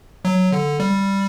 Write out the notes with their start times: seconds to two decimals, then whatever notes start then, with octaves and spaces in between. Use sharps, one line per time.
0.25 F#3
0.52 D3
0.80 G3